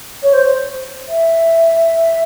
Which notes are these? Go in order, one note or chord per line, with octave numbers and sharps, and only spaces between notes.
C#5
C5
E5